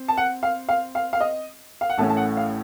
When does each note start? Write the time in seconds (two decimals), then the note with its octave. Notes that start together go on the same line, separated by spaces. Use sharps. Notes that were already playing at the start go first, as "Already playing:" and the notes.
Already playing: C4
0.08 A5
0.17 F#5
0.43 F5
0.69 F5
0.95 F5
1.13 F5
1.21 D#5
1.81 F5
1.90 F#5
1.98 A1 A2 A3 C#4 A5
2.09 A5
2.17 F#5
2.37 F5